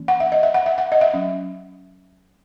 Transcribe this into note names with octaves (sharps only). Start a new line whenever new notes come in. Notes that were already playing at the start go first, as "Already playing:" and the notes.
Already playing: E3 A#3 C#4
F#5
E5
D#5
E5
F#5
E5
F#5
D#5
E5
F#3 C#4